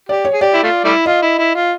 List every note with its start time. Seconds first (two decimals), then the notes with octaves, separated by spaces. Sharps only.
0.09 G4 D5
0.25 C#5
0.33 G#4
0.41 G4 D5
0.54 E4
0.63 A3 F4
0.85 G3 A3 E4
1.06 F4 D#5
1.22 E4
1.38 E4
1.55 F4